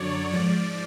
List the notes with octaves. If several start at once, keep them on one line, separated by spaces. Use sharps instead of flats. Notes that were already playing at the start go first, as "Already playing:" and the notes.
Already playing: F#2 D3 F#3 C#5 D5
G#2 F3 D5